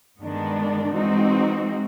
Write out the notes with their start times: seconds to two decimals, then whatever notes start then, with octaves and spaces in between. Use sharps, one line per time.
0.20 G2 D#3 G#3 B3 D4
0.96 E3 G#3 C4 D#4 F#4